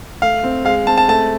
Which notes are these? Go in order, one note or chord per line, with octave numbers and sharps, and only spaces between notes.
A3 F5
C4
G#3 F5
C4 A5
A5
A3 A5